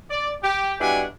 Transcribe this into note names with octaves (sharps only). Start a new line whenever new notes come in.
D5
G4
B2 G3 D4 E4 F#5 G#5